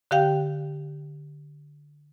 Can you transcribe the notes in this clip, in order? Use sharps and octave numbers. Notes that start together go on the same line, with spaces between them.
D3 G4 F5 G5